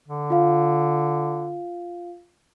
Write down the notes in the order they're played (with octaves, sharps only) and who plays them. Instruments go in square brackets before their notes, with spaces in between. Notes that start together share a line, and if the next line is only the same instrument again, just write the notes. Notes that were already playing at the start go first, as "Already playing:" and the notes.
[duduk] D3
[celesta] F4 F5